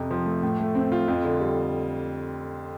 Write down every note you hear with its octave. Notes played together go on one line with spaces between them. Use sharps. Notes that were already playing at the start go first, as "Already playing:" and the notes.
Already playing: F2 C3
F3
A3
A2
A3
C4
F4
F2
D3
G3